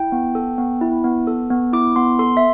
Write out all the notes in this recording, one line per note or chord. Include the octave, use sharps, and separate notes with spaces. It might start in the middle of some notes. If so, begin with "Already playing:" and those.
Already playing: E4 G5
B3
A4
B3
E4
B3
A4
B3
E4 D6
B3 C6
A4 C6
E5